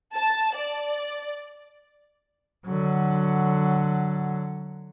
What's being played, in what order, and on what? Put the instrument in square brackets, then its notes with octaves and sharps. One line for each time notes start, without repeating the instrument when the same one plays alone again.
[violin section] A5
D5
[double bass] D3 F#3